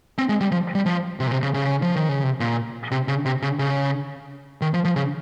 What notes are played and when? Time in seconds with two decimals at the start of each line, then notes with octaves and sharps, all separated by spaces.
0.18 C4
0.29 G#3
0.41 G3
0.51 F3
0.75 G3
0.86 F3
1.20 C3
1.27 A#2
1.32 C3
1.43 C#3
1.54 C#3
1.82 F3
1.96 D#3
2.09 C#3
2.23 C3
2.40 A#2
2.91 C3
3.08 C#3
3.26 C3
3.42 C#3
3.59 C#3
4.62 D#3
4.74 F3
4.85 F3
4.96 C#3